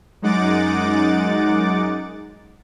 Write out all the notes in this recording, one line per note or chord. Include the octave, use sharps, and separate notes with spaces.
F#2 G#3 D#4 F#5 D6 A6